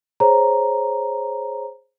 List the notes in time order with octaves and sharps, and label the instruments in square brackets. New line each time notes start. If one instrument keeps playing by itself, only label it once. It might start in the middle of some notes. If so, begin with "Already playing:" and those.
[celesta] G#4 C5 C#5 A#5